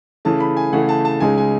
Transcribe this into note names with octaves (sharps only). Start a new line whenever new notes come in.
C#3 E3 A3 A5
B5
G#5
C#3 E3 A3 F#5
A5
A5
C#2 C#3 G#3 D#4 G#5
G#5